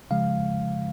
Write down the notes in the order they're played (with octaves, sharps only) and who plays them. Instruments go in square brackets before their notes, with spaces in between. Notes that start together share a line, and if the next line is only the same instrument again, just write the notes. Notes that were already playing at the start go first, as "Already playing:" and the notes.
[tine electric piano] C#3 F3 G#3 F5